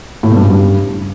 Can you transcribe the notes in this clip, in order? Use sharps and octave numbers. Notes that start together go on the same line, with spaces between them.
A2
B2
G2
C#3
G2